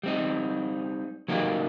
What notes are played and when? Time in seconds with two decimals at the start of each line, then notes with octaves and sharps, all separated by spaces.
0.03 G3 C4 D#4
1.28 F#3 A#3 D#4 G4